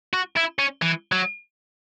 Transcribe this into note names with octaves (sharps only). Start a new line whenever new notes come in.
F#4
E4
C#4
E3
F#3